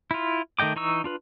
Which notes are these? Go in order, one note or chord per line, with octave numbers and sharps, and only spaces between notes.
E4 F4
D#3 A3 D#5 G5 D6
E3 D#4 C#6 E6
D4 F4 B4